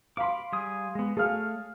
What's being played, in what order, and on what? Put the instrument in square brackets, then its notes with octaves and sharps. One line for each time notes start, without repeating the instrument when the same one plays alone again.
[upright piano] F5 C6 [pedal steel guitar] B5 D6
[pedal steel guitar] G3 G#4 D#6
G#3 B3
[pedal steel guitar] A3 C#5 [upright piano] G#4 F5 F6